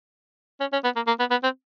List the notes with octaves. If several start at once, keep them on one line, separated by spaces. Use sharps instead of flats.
C#4
C#4
B3
A#3
A#3
B3
B3
C4